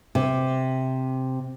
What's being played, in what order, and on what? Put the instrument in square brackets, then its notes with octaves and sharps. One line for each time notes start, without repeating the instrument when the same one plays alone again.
[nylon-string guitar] C3